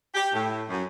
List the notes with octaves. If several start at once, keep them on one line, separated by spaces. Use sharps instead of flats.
G4
A2
F#2